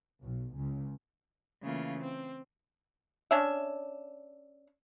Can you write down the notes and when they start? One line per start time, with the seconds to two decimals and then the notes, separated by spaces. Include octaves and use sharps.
0.22 B1
0.56 C#2
1.62 C#3 E3 A3 A#3 E4 F4
2.00 C4
3.31 C#4 D4 E5